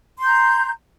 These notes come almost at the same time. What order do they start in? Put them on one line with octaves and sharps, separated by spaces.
C6 G6 A#5